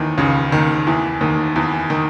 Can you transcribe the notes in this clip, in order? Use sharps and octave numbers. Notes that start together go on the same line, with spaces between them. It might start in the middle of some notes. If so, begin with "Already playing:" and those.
Already playing: D#2 D#3 E3
C#2 C#3
D#2 D#3
E2 E3
D#2 D#3
E2 E3
D#3